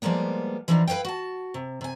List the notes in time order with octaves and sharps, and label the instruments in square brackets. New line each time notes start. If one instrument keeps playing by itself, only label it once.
[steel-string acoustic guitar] F3 G3 G#3 A#3 B3
E3 F3 A3 D4 D#4
E4 B4 C#5 F5 G5
F#4 A5
C3
C3 G#5